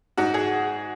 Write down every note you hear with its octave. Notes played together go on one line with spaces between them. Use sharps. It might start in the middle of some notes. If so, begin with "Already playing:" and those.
G#2 F#4
G#4